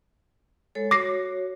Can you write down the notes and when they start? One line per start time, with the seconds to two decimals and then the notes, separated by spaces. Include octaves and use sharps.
0.75 G#3 A4 C#5
0.91 F#4 C#5 D6 A#6 C7